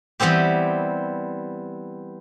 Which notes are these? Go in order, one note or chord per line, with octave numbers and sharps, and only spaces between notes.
E3 G3 B3 C4 G4